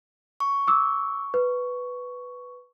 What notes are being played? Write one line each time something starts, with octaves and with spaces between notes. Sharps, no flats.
C#6
D6 E6
B4